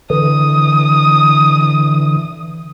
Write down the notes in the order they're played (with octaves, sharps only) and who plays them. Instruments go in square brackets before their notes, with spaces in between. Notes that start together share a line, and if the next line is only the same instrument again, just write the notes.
[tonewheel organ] D3 E3 [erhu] D#6